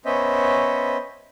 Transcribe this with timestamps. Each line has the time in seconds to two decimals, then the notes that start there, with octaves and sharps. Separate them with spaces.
0.05 B3 C#4 C5 D#5 E5